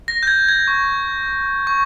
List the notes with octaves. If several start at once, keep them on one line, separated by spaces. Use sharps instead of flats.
A#6
G6
G#6
G#6
C#6
C#6